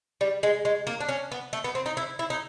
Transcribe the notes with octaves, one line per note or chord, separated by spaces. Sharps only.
G3
G#3
G#3
A#3
D4
C#4
B3
A3
B3
C4
D#4
E4
E4
D#4